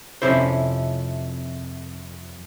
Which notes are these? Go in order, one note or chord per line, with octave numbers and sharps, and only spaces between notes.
F2 C3 C#4 E4 C5